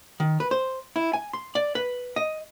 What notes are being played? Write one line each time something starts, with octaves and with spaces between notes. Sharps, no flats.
D#3
B4
C5
E4
G#5
C6
D5
B4
D#5